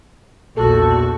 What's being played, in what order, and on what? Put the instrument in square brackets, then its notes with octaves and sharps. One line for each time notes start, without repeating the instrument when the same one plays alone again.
[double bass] A#1 E2 [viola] F#4 [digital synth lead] A4